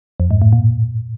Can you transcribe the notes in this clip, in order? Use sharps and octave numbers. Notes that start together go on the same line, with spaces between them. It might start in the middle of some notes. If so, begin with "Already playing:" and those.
F2
G#2
A2
A#2